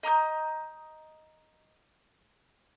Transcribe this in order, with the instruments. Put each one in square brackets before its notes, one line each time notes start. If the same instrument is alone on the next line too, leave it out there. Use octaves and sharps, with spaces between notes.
[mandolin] D#5 A#5 D#6 G6